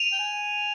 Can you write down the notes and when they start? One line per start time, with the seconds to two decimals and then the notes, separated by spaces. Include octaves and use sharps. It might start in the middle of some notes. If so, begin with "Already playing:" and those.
Already playing: D#7 F7
0.12 G5
0.19 G#5